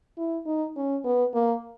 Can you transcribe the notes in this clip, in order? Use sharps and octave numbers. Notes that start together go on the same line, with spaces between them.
E4
D#4
C#4
B3
A#3